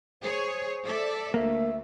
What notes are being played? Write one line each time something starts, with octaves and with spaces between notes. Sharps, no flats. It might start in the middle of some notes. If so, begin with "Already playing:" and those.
G#4 C5 C#5
A4 D5 E5
D2 A3 A#3 E5